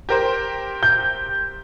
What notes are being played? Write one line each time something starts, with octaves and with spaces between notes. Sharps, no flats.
G4 A#4 C5
G6